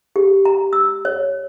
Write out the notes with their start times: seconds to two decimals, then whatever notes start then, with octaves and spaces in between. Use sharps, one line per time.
0.16 G4
0.45 A#5
0.73 E6
1.05 C#5